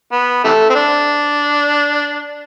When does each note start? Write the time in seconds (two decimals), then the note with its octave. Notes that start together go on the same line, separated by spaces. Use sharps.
0.12 B3
0.44 C3 E3 A3
0.70 C4
0.75 D4